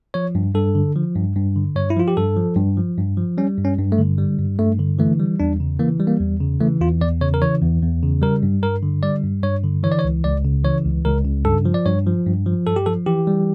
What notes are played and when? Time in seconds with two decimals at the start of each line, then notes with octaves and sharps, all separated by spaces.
0.14 F3 C#5
0.35 G2
0.55 G2 A4
0.75 D3
0.96 F3
1.15 G2
1.36 G2
1.56 D3
1.76 G2 C#5
1.90 E4
1.96 F3 F4
2.08 G4
2.17 G2 A4
2.37 F3
2.56 G2
2.77 F3
2.97 G2
3.17 F3
3.38 G3 C#4
3.58 G2
3.65 C#4
3.78 G2
3.92 A3
3.98 D3
4.18 G3
4.38 G2
4.59 G2 A3
4.79 D3
4.99 E3 A3
5.20 G3
5.40 E2 D4
5.60 C#3
5.79 E3 A#3
6.00 G3
6.07 A#3
6.20 E2
6.40 C#3
6.61 E3 A3
6.81 E2 F4
7.01 E2 D5
7.21 C#3 C#5
7.34 A#4
7.42 E3 C#5
7.62 E2
7.82 E2
8.03 C#3
8.22 G3 A#4
8.43 G2
8.62 G2 A#4
8.83 D3
9.03 G3 D5
9.23 G2
9.43 G2 C#5
9.64 D3
9.83 E3 C#5
9.92 D5
9.99 C#5
10.05 C#2
10.24 C#2 D5
10.44 C#3
10.64 E3 C#5
10.85 C#2
11.05 C#2 A#4
11.25 C#3
11.45 G2 A4
11.65 F3
11.74 D5
11.86 G2 C#5
12.06 F3
12.26 G2
12.46 F3
12.67 G2 A4
12.76 G4
12.86 F3 A4
13.06 E3 G4
13.27 G3